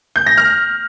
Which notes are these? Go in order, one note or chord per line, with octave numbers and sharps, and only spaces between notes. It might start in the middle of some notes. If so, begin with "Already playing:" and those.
G6
A#6
F6